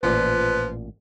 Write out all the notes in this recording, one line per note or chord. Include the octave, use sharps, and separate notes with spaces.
A1 A#2 F3 B4 D5